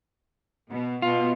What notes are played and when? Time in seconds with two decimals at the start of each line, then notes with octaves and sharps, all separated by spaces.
0.69 B2
1.02 B2 F4